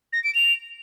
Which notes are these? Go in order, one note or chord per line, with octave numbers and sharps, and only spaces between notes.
A#6
D7
F7